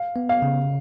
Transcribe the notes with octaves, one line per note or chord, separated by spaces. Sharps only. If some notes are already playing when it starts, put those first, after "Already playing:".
Already playing: F5
B3
F5
C#3